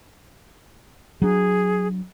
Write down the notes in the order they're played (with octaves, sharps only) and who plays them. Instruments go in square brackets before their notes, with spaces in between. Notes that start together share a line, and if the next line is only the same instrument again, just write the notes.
[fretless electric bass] F#3 D4 [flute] G#4